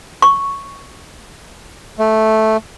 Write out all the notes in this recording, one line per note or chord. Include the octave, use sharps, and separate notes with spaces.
C#6
A3